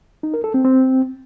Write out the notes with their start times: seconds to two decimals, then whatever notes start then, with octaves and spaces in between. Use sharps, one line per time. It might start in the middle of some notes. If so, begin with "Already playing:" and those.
0.23 D#4
0.34 A#4
0.44 A4
0.54 C4
0.65 C4